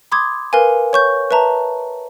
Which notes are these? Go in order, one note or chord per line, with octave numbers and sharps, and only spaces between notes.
B5 C6 D6 D#6 G#6
A#4 B4 F5 G#5
C#5 C#6 G6
B4 E5 A5 A#5